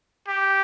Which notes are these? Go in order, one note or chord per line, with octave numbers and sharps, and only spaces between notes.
G4